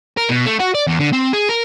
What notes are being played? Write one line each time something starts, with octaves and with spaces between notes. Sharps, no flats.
A#4
B2
A3
F#4
D5
E2
D3
C4
G#4
A#4